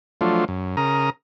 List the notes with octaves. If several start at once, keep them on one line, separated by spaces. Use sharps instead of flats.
F3 F#3 A3 D4 F4
F#2
C#3 A#4 A#5 D#6